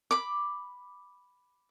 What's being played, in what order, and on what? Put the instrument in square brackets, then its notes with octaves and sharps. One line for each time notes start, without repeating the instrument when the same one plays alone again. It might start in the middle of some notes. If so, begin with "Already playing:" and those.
[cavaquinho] B5 D6